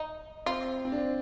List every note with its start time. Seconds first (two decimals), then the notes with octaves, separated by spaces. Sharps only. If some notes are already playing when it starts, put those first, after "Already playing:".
Already playing: D#4
0.46 C4 F4
0.85 C4
0.92 D4